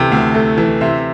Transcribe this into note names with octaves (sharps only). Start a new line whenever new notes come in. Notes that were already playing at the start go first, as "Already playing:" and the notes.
Already playing: D2 C3 E3 A3 G5
D2
A3
E3
C3 E5